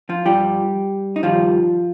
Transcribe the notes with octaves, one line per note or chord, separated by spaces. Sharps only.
F3 F4
G2 F3 G3 G4
D#4
G2 D#3 F3 G3 F4